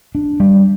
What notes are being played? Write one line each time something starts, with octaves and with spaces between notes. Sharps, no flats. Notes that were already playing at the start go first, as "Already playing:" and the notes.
D4
G3